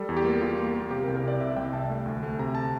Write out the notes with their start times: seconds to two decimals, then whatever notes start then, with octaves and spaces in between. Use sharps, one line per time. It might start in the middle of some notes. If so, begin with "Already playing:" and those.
Already playing: G3 A4
0.09 E2
0.17 G4
0.25 A#3
0.42 G3 F4
0.58 A#3
0.74 A#3
0.90 C3 G4
1.04 A#4
1.08 C2
1.16 A#4
1.23 C3 D5
1.40 C3 E5
1.56 C2 G5
1.73 C2 A5
1.90 A3
2.06 D2
2.23 A3
2.39 C3 A#5
2.55 A5